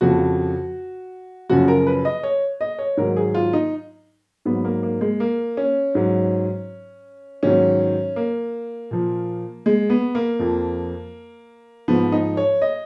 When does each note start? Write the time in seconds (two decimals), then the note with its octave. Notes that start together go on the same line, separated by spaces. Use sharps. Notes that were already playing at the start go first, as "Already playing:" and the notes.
0.01 F2 C#3 F3 F#4
1.49 F#2 C#3 F3 F#4
1.68 A#4
1.87 B4
2.05 D#5
2.23 C#5
2.61 D#5
2.79 C#5
2.97 G#2 D#3 F#3 A#4
3.16 G#4
3.35 F4
3.53 D#4
4.45 G#2 F#3 B3
4.65 A#3
4.83 A#3
5.01 G#3
5.20 A#3
5.57 C#4
5.95 G#2 F#3
7.43 G#2 D#3 F#3 C#4
8.16 A#3
8.91 A#2 F3
9.66 G#3
9.90 B3
10.15 A#3
10.39 F2 F3
11.88 G#2 F3 B3
12.12 D#4
12.37 C#5
12.62 D#5